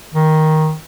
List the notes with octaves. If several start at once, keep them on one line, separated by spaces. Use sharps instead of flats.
D#3